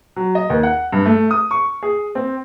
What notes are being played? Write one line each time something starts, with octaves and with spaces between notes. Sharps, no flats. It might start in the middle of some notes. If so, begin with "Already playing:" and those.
F#3
D#5
D#2
F#5
G2
A3
D#6
C#6
G#4
C4